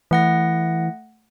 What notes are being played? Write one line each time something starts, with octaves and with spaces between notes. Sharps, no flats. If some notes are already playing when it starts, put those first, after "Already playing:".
E3 A3 F#5 A#6